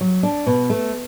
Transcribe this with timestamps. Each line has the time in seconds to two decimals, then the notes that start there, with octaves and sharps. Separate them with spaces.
0.01 F#3
0.23 D4
0.47 B2
0.70 A3